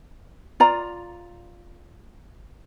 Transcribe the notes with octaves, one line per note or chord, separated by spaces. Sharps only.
F4 D5 A#5